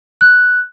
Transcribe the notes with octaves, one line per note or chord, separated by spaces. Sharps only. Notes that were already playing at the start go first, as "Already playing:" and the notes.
F#6